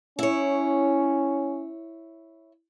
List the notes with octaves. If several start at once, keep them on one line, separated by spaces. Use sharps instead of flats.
C#4 E4 C#5